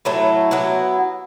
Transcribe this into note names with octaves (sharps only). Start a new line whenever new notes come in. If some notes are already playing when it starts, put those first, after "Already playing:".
A2 F#3 A3 E4
F#3 B3 E4